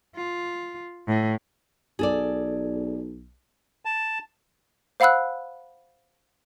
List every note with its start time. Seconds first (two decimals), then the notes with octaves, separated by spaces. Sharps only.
0.16 F4
1.08 A2
1.99 B1 G#4 A4 D5
3.85 A5
5.00 C5 F5 F#5 B5 E6 F#6